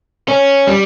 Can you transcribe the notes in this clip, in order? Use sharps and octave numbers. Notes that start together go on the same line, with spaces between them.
C#4
G3